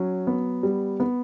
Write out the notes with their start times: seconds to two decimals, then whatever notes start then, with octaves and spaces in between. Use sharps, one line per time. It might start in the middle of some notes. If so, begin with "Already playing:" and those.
Already playing: F#3 C#4
0.27 B3
0.63 G3
1.00 B3